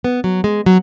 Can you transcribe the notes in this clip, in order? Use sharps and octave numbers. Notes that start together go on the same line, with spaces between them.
B3
F#3
G#3
F#3